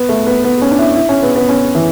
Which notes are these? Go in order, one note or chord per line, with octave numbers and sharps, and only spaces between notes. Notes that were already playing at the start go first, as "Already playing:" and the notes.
Already playing: B3
A3
B3
B3
C#4
D4
E4
E4
C#4
B3
B3
C#4
E3